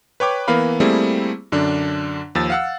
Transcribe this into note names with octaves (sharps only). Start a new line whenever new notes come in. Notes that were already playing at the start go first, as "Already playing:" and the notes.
B4 C#5 G5 D6
E3 A#3 B3 A#4 F5 B5
G3 A3 A#3 C4 E4 G#4
F#2 D3 D4
D#2 F3 E6 A6
F5 F#5 E6